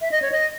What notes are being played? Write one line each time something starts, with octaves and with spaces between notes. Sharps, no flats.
E5
D#5
C#5
D#5